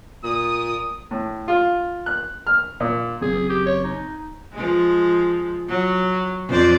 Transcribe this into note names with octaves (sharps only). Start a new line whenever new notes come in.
A#2 D#6
A2
F4
F#6
F6
A#2
F#1 F#2 C4 G#4
G4
C#5
D#4
F3 G#3
F#3
F2 C5 D5